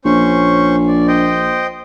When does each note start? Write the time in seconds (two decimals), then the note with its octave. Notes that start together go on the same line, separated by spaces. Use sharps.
0.05 A#1 C#4 C5 C#6
0.88 D5
1.08 C5 D#5 G5